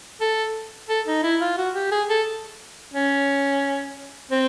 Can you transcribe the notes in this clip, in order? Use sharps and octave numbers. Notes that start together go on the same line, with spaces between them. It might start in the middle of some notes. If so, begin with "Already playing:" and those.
A4
A4
D#4
E4
F4
F#4
G4
G#4
A4
C#4
C4